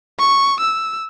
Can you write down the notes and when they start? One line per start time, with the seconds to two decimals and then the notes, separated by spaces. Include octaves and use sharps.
0.19 C#6
0.61 E6